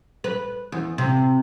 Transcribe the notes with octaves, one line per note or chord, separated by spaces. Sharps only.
B4
E2
C3